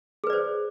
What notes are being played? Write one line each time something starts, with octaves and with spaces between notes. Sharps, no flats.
G#4 B4 C5 D5